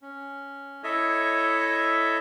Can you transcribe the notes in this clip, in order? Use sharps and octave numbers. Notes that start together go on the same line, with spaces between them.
C#4
E4 A4 C#5 D#5 E5